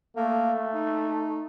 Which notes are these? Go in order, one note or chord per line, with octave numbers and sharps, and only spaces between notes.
A3 A#3
D#4